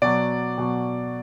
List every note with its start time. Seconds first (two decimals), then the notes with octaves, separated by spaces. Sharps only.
0.02 B2 F#3 D5
0.58 B2 F#3